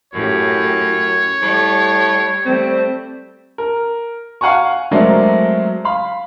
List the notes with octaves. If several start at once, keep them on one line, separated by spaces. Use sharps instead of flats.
F#2 A2 G4 C#5
A2 G3
G3 A3 C4
A#4
F5 F#5 G#5 A#5 C#6
F#3 G#3 A3 C4 A#4 D5
F5 B5